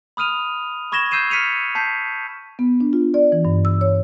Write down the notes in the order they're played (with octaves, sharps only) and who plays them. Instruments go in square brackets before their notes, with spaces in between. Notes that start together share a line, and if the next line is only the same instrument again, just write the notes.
[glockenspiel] B5 D#6 F6 D#7 F7
B5 C#6 G#6 A#6 E7 G7
E6 G6 C7 D#7 E7
F6 B6 C#7 D#7 F7
A5 G6 B6 C7
[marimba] B3
D4
F4
D5
E3
G2
E6
C#5